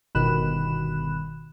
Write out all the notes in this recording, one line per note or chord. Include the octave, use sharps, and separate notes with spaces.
G1 B2 D#3 B5 F#6 E7